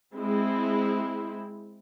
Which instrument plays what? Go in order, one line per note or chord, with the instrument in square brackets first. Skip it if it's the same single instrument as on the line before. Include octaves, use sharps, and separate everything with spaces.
[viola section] G#3 C4 E4